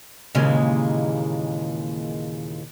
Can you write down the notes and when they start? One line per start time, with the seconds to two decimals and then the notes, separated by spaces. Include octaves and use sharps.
0.35 D#2 A#2 C#3 E3 G#3